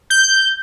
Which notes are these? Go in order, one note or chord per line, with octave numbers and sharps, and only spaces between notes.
G6